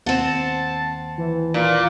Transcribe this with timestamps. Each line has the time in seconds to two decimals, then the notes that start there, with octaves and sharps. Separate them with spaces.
0.06 D#2 C4 F#5 A5
1.18 E3
1.54 A#2